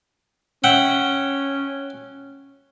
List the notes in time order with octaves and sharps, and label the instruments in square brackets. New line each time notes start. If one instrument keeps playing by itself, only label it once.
[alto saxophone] C#4 [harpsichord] E5 F#5 G5